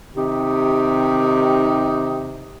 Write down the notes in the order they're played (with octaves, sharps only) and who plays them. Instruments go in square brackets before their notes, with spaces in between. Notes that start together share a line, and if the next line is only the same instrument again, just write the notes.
[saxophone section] C3 D#3 D#4 G4